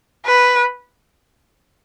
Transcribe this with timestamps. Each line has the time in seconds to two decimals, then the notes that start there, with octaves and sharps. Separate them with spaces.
0.26 B4